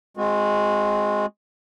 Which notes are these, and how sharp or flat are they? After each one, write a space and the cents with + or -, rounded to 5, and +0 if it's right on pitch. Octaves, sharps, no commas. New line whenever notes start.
G#3 +0 C4 +5 F#4 -35